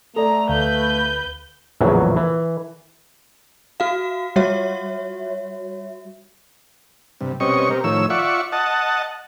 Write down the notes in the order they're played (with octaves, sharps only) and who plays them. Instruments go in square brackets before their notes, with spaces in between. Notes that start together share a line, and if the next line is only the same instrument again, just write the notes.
[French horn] A3 [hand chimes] A4 D5 [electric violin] A#5
[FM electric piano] D2 [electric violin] B4 G6 [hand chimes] F5
[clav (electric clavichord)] A#1 E2 A2 C#3 E3 F#3
E3
[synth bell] F#4 F5
G3 F#4 C#5 E5
[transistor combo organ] G2 C3
B2 G3 C4 C#4 D#5 C#6
C4 G4 A#4
A2 D#3 F3 C#5 E6
F4 D5 E5 F#5 C#6
D#5 F#5 A5